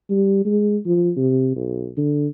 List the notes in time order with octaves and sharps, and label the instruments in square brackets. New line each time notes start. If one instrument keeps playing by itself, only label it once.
[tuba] G3
G#3
F3
C3
B1
D3